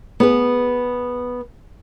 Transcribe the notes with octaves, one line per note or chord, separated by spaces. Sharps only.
B3 G#4 B4